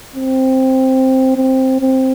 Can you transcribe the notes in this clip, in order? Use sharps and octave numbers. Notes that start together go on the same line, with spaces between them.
C4
C4
C4